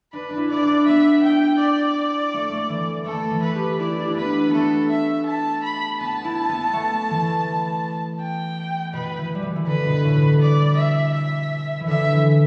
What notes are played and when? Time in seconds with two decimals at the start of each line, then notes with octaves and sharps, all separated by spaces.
0.13 D4 B4
0.30 D4
0.37 E4
0.49 E4 D5
0.62 D4
0.86 B3 E5
1.24 G5
1.59 D5
2.34 A3
2.52 A3
2.69 E3
3.06 A3 A4
3.31 E3
3.42 B4
3.56 G4
3.79 E4 D5
3.90 G4
3.99 E4
4.08 D4
4.16 B3 B4
4.47 B3
4.53 A3 A4
4.90 E5
5.26 A5
5.63 B5
6.00 B3 A5
6.24 E4
6.49 B3
6.73 A3
7.11 E3
8.20 G5
8.93 B2 B4
9.18 E3
9.35 G3
9.42 E3
9.56 E3
9.67 D3 B4
9.86 B2
10.04 A2
10.22 B2
10.40 D5
10.76 E5
11.14 E5
11.80 E3
11.87 D3 E5
12.11 E3